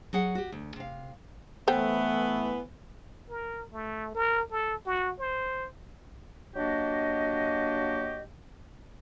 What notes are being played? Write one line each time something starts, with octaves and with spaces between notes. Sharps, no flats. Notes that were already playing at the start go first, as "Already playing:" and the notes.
F#3 G#4 F#5
F#4 G4
D2
C3 F5
E3 A3 B3 A4 C5 G5
A#4
A3
A#4
A4
F#4
C5
F#3 A#3 D4 F#4 G4 D#5